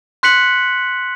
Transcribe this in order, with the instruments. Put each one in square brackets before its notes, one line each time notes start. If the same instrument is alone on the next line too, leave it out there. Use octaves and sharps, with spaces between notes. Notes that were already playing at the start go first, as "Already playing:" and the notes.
[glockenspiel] C6 F#6 B6 C#7 F#7